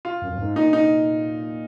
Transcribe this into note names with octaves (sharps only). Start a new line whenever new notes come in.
F4
F#2
F#2
G#2
A#2 D#4
D#4